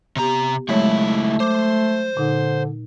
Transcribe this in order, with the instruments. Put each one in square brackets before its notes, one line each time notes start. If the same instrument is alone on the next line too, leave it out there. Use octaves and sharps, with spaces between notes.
[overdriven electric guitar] C3 A#5 [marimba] B3 G4
[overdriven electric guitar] C#2 E4 [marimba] F#3 G#3 C#5 [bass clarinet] A3
[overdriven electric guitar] C5 [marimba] D6
[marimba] A#2 D#4 [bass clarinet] D3